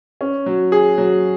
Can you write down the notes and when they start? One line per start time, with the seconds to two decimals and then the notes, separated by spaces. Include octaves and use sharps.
0.21 C#4
0.46 F#3
0.72 G#4
0.98 F#3